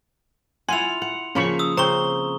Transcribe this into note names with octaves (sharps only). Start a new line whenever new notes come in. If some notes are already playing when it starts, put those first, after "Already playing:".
E4 F4 F#5 G#5 C6 F7
F#5
C#3 F3 A#3 C#4 B5 C#6
D#6 E6
C#3 C4 C5 A#5 C#6 G7